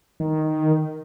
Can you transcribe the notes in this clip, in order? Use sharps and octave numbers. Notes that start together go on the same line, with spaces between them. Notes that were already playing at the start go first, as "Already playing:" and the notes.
D#3